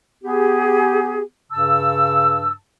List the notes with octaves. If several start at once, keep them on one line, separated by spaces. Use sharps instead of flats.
B3 G4 G#4
G2 C#3 A5 E6